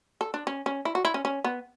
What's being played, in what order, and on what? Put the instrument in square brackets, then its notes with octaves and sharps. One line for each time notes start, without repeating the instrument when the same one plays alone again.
[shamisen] A4
D4
C#4
C#4
E4
F#4
E4
C#4
C#4
B3